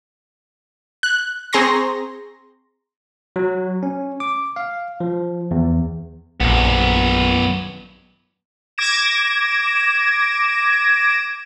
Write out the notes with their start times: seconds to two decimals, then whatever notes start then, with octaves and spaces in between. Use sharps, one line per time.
1.03 F#6
1.53 C4 G#4 A#5 C6 C#6 A#6
3.36 F#3
3.83 C#4
4.20 D6
4.56 F5
5.00 F3
5.51 E2
6.40 A#1 F#2 B3
8.78 D6 G#6 A#6 D7 E7